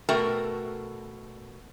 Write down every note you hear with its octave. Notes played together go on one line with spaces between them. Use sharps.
B2 A3 F#4 A4 A#4 G5